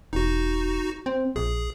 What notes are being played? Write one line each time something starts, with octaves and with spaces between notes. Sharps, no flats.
E1 D#4 F#4
C4
A#1 G#4